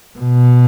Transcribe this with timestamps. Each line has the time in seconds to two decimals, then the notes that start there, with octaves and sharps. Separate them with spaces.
0.19 B2